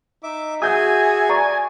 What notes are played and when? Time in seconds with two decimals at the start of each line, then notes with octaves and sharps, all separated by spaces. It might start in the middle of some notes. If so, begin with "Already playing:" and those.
0.23 D#4 E5 D6
0.62 F#4 G#4 E5 G#5 D#6 G6
1.29 D5 A#5 C#6